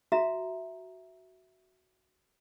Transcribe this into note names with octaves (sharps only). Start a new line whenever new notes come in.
F#4 E5 A#5